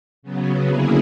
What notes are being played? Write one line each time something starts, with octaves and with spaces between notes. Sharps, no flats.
C#3 F#3 B3
D3 F#3 A#3 C#4 E4 G#4